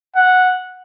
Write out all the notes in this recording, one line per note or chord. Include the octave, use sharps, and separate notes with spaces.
F#5